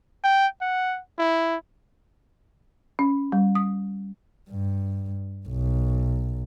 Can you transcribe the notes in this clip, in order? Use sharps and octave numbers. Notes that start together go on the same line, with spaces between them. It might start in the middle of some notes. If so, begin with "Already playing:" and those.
G5
F#5
E4
C#4
G3
D#6
G2
B1